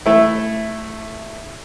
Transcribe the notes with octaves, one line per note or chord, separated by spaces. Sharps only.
A3 E4